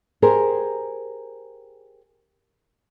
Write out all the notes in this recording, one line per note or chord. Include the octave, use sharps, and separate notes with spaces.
G4 G#4 A#4 C5